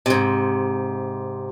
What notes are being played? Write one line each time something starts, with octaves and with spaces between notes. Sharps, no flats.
G#2 C3